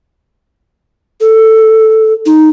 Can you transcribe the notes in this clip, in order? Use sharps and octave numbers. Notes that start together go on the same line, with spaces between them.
A4
D#4